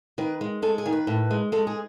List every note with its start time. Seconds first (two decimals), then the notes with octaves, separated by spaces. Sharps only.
0.18 D#3 B4
0.41 G#3
0.62 G#3 A4
0.78 G#4
0.86 D#3
0.92 B4
1.07 A2
1.31 G#3
1.52 G#3 A4
1.67 G#4